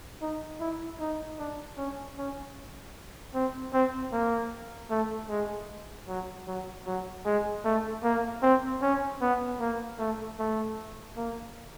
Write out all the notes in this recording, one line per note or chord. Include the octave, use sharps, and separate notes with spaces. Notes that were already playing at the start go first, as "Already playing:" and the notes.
D#4
E4
D#4
D4
C#4
C#4
C4
C4
A#3
A3
G#3
F#3
F#3
F#3
G#3
A3
A#3
C4
C#4
B3
A#3
A3
A3
A#3